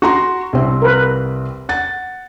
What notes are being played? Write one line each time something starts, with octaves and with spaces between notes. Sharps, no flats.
F#4 A#5 C6
C2 C4
A#4 B4
F#5 A6